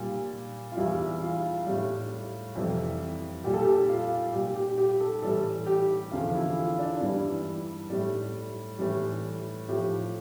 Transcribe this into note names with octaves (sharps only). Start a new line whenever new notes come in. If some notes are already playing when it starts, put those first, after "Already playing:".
Already playing: A#2 G3
F4
E2 E3 G3 E4
F4
A2 G3
F2 C3 E3 G3
A#2 G3 G4
A4
G4
F4
A#2 G3 G4
G4
G4
A4
A2 E3 G3 A4
G4
E2 D3 F3 F4
E4
F4
D4
G2 E3 G3 E4
A2 G3
A2 E3 G3
A2 F3 G4